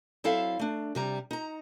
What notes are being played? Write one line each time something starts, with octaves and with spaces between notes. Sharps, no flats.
F#3 C4 E4 A4 E5 F5
A3 D4
C3 G3 A#5
D#4 A#5